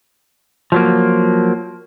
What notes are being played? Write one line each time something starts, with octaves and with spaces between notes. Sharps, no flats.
F3 F#3 A#3